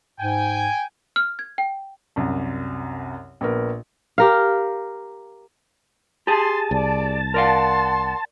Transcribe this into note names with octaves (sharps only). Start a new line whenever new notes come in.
G#2 G5 G#5
F6
G#6
G5
C2 F#2
A#1 B3 A#4
G4 A#4 F5
G4 G#4 A5 C6
C2 D5
A#4 D5 F5 F#5 C6